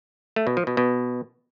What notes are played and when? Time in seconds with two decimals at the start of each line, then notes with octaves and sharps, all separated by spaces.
0.36 A3
0.47 B2
0.57 F3
0.67 B2
0.77 B2